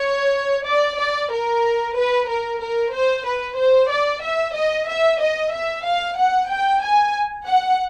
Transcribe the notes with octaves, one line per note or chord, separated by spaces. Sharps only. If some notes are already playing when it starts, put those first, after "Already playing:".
Already playing: C#5
D5
D5
A#4
B4
A#4
A#4
C5
B4
C5
D5
E5
D#5
E5
D#5
E5
F5
F#5
G5
G#5
F#5